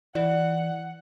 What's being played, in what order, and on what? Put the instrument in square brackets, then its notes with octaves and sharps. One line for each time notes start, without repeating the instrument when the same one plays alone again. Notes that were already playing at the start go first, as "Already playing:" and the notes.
[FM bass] E3 [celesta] D5 [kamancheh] F#5